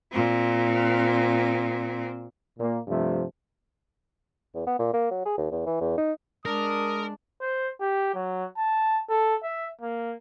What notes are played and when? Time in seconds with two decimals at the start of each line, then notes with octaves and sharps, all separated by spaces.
0.11 A#2 C4
2.59 A#2 A#3
2.88 G2 C3 F3 A3
4.54 E2
4.67 B3
4.79 A#2
4.93 A#3
5.11 F#3
5.25 G#4
5.38 D#2
5.51 E2
5.66 E3
5.81 E2
5.97 D#4
6.45 G#3 D4 A#4 D#6
7.41 C5
7.81 G4
8.14 F#3
8.57 A5
9.10 A4
9.43 E5
9.81 A#3